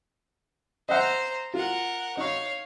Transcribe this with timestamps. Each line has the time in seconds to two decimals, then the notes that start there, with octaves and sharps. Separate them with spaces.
0.89 C5 D#5 E5 F#5 A#5
1.54 F4 A#4 F#5
2.17 D#4 C#5 F5 C#6